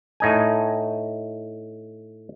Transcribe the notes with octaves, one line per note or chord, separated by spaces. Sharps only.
A2 D#4 G#5